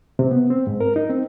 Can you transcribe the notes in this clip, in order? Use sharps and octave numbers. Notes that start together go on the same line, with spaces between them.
C3
B3
C4
G#2
A#4
D#4
C4